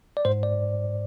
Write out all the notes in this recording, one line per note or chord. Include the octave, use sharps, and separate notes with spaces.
D5
G#2 C5
D5